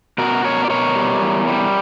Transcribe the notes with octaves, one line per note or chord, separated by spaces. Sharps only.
B2 F#4 A#4
B2 A#4 C#5
D5
B2 A#4 C#5
G3
E2
G3